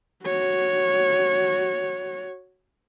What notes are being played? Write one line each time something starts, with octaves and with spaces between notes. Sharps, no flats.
F#4 C#5